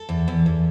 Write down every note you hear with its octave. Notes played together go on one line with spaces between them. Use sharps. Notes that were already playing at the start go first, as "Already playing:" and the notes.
Already playing: A4
E2
E2
E2